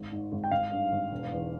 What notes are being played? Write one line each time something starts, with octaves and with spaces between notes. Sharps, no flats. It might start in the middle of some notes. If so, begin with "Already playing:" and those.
Already playing: G#1
G#2
G#1
G5
G#1 F5
G2
G#1
E1
E2